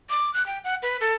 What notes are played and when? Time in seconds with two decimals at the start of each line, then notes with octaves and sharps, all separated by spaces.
0.10 D6
0.34 F#6
0.46 G5
0.64 F#5
0.82 B4
1.01 A4